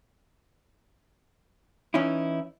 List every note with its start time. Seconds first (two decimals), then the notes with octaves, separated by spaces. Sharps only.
1.94 E3 C#4 D#4 E4